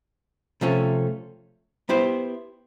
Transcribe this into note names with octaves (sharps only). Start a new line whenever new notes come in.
C3 F3 A3 C#4
B3 E4 G4 C5